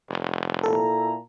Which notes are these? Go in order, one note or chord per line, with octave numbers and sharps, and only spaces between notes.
F1
A#2 E4 A4 A#5